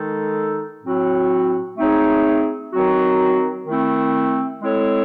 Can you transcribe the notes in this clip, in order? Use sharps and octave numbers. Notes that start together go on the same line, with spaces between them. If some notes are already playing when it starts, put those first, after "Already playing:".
Already playing: D#3 G#3 D#4 A4
A2 F#3 C4 F#4
A3 C4 D#4 G#4 C#5
D#3 F#3 C4 F#4
D#3 A3 C4 E4
G#3 C4 E4 A4 C#5